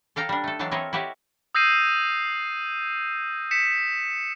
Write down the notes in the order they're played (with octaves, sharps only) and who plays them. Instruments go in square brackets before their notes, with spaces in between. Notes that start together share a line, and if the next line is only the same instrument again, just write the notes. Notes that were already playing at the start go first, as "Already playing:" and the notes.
[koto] A4 F5 G5 A#5
G3 D4
A3 A4
E3 F#3 G#3 F5 G5 A5
C4 E4 A4 A#4 C#5 D#5
E4 F#4 G4 C#5 D#5 E5
[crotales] D#6 E6 G6 A#6 C7 D#7
B6 C#7 E7